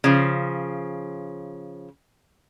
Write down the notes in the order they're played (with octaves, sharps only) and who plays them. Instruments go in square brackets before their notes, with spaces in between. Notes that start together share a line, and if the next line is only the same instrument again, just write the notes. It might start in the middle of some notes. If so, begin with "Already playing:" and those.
[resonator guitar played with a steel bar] C#3 F3